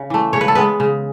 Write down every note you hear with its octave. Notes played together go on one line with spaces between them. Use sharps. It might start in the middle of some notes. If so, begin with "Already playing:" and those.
Already playing: C#3
E3 A3
C#3 C#5
B4
A4
G#3 B3 B4
C#3